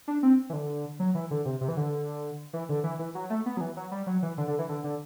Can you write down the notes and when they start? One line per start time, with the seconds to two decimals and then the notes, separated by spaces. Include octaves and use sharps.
0.08 D4
0.23 C4
0.50 E3
0.53 D3
1.00 F#3
1.15 E3
1.31 D3
1.45 C3
1.61 C3
1.68 E3
1.77 D3
2.53 E3
2.69 D3
2.84 E3
2.99 E3
3.15 F#3
3.30 A3
3.46 B3
3.57 F#3
3.61 E3
3.77 F#3
3.91 G3
4.07 F#3
4.23 E3
4.38 D3
4.48 D3
4.59 E3
4.69 D3
4.84 D3